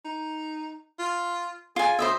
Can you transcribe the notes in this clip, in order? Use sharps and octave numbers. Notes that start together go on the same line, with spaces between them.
D#4
F4
F4 G#4 G#5
D2 C5 D#5 E5